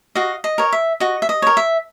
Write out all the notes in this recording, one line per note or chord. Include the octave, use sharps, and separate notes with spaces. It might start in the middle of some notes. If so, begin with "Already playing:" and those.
F#4 D#5 F5
D#5
A#4 C#5
E5
F#4 D#5
E5
D#5
A#4 C#5
E5